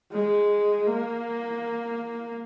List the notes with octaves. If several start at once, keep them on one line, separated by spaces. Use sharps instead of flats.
G#3
A#3